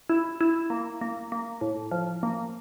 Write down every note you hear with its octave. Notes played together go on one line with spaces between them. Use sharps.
E4
E4
A#3
A#3
A#3
A2
F3
A#3